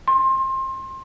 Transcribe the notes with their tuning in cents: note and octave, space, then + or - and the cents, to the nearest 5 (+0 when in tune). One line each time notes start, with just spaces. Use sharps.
C6 +25